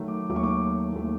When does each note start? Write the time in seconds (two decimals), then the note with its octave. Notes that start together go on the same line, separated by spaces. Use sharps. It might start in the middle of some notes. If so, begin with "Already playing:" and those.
Already playing: D#3 F#3 A3
0.08 D6
0.29 D#2 D#3 F#3 A3 D6
0.36 C#6
0.43 D6
0.92 D#2 D#3 F#3 A3